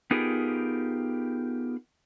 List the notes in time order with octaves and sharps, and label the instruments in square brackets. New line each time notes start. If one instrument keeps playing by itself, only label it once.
[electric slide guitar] B3 D#4 F4 G4 G#4 A#4